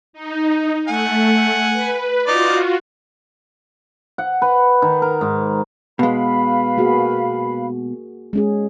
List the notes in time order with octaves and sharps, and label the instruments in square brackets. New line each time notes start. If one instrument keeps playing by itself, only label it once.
[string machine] D#4
[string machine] A3 [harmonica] F#5 G#5
[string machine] B4
[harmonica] D#4 D5 [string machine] F4 F#4
[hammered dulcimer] F#5
B4
D#3
A#4
G#2
[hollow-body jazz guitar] B2 G#3 [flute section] B4 F5 B5
[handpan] A#3 F#4 G#4
G#3 C#4 G#4